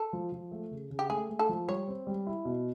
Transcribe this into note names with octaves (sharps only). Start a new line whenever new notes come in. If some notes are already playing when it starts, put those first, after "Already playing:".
Already playing: A4
F3
F3
A3
C#3
C#3
G4
A3 G#4
A3
A4
F3
G3 C#5
C4
G3
E4
B2